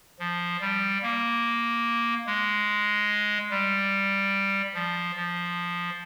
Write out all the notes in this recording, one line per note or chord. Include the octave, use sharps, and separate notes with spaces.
F3
G3
A#3
G#3
G3
F3
F3